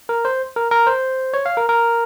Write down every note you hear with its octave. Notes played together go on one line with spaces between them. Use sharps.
A#4
C5
A#4
A#4
C5
C#5
F5
A#4
A#4